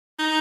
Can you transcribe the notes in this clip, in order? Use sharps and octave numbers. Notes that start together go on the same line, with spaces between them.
D#4